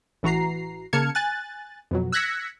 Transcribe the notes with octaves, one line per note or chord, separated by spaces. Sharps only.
A1 E3 F#4 A#5 C7
C#3 A#3 A5 F6 G#6 C#7
G#5 F#6 A6
F2 B2 F#3
E6 F#6 G#6 A#6 B6 C#7